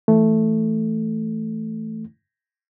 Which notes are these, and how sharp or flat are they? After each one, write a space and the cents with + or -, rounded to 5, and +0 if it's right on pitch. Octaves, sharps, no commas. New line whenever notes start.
E3 +0 A3 +0